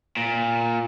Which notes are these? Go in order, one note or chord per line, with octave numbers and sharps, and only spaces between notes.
A#2